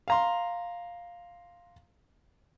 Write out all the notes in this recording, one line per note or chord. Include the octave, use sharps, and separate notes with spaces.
F5 A#5 C6